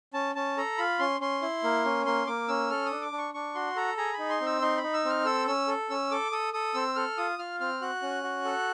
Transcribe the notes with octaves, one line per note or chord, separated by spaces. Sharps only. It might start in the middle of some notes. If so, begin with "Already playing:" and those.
C#4 A5
C#4 A5
A4 A#5
F4 B5
C#4 C6
C#4 C6
E4
A#3
C#4
A#3 C6
A#3 D6
C#4 E6
A4 F6
D#6
D4
D6
D4
C#6
D4 C#6
F#4 C6
A4 A#5
G#4 A#5
B5
D#4
C6
C4 E6
D#4 C6
B5
D#4
E6
C4 F6
A4 E6
C#4 E6
A4
C#4 E6
A4 D6
A4 D#6
A4 D#6
C4 E6
A4 F6
F4 D#6
F4 F6
C4 F6
F#4 F#6
C#4
F#4
A4